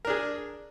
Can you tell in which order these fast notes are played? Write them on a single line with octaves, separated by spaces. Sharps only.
A#4 D4 G#4